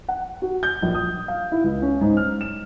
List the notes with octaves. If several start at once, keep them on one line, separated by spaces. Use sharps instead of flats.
F#5
F#4
G6
A#1
D#6
F5
E4
C#2
C#4
G#2
F6
E7